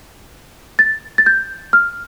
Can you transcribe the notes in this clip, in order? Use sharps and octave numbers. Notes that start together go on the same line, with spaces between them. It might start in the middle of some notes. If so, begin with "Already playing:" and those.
A6
A6
G6
F6